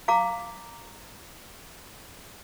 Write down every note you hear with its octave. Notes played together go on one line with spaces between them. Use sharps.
F5 A#5 D6